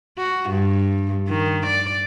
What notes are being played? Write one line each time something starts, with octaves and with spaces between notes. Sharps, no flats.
F#4
G2
D#3
D5